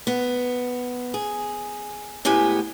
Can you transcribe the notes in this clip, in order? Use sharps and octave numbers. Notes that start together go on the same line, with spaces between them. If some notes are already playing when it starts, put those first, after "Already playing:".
B3
G#4
A2 G#3 B3 G4 G#5